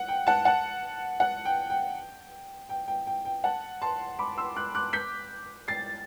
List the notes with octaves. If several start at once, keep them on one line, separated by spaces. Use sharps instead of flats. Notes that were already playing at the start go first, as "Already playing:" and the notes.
Already playing: F#5
G5
F#5 A5
F#5 A5
F#5
G5
G5
G5
G5
G5
G5
F#5 A5
A5 C6
B5 D6
C6 E6
D6 F#6
D6 F#6
G6 B6
A6 C7